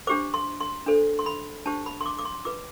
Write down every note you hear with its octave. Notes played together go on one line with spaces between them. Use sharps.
D4 G4 C5 D6
C6
C6
D4 A4 C5
C6
B5
D4 G4 C5 A5
B5
C6
D6
D6
C6
F4 B4 D6